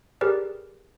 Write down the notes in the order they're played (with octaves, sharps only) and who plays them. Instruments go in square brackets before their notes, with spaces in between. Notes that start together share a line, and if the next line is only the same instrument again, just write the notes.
[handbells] G4 G#4 A#4 B4 D5